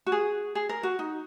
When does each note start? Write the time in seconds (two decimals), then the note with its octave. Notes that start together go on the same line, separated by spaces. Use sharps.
0.06 F#4
0.12 G#4
0.55 G#4
0.69 A#4
0.83 F#4
0.99 D#4